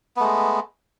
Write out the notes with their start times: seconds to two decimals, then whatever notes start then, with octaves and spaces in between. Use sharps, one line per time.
0.16 B3
0.20 A3
0.24 G#3